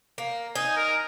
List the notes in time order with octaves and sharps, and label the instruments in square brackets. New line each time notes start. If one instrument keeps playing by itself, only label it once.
[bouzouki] A#3
[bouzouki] D#4 [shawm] G#5
[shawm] A#4